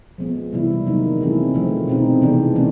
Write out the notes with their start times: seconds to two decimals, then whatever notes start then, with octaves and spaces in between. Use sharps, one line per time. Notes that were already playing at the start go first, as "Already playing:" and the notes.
0.18 F3 G#3 B3
0.53 C3 E3 G3 B3 E4
0.87 D#3 F#3 A#3 D#4
1.21 E3 A3 C4 E4 G#4
1.54 C#3 F3 A3
1.88 B2 G#3 C4 D#4
2.22 C3 E3 G#3 B3 D4
2.56 E3 A3 C#4